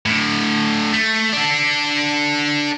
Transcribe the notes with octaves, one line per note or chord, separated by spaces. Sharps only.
A2 D3
A3
D4 A4